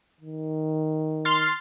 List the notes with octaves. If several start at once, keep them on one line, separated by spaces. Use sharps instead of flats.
D#3
C6 F6 A6